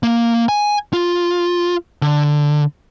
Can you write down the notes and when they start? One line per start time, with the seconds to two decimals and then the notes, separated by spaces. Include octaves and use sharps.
0.03 A#3
0.49 G#5
0.93 F4
2.02 D3